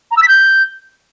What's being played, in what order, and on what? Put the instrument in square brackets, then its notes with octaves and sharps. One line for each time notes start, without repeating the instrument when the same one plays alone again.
[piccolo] A#5
E6
B6
G6